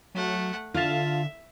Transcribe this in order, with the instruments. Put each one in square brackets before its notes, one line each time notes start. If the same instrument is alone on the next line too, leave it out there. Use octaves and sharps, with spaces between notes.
[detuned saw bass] F#3 [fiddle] A3 F#5
[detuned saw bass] D3 [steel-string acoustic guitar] F4 [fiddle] E5 [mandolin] F5 A5